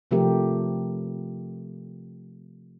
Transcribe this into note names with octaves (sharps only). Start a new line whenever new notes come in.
C3 F3 A3 C4 G4 A#4